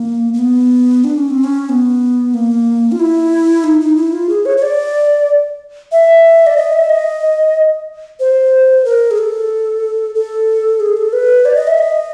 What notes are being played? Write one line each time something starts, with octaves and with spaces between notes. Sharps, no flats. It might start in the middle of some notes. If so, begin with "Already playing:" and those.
Already playing: A#3
A#3
B3
D4
C#4
C4
C#4
B3
A#3
F4
E4
D#4
D#4
E4
F4
G#4
C#5
C#5
D5
E5
D5
D#5
E5
D#5
C5
A#4
G#4
A4
A4
G#4
A4
B4
D5
D#5
E5
D#5